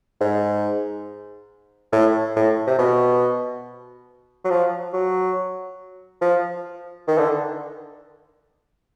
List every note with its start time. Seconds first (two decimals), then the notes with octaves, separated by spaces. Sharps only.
0.21 G#2
1.92 A2
2.36 A2
2.67 C3
2.78 B2
4.44 F#3
4.50 F3
4.93 F#3
6.22 F3
7.07 D#3
7.18 D3